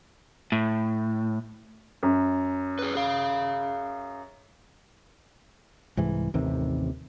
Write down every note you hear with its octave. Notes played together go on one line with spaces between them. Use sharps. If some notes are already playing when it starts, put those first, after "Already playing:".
A2
F#2
G#4 B4
G#4 F5
C2 G#2 E3
A1 D#2 C3 D#3